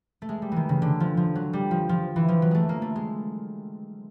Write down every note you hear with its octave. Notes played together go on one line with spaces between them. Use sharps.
A3
G#3
G3
D#3 E3
C#3
D3
F3
F3
F#3
G3
F3
F3
E3
F3
F#3
G#3 A3
A#3
A3
G#3